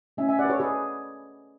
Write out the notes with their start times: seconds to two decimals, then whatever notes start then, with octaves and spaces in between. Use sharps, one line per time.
0.17 A3 C#4 E4 E5 G#5
0.29 E5 G#5
0.39 D5 F#5
0.44 B4
0.49 A4 C#5
0.60 G#4 B4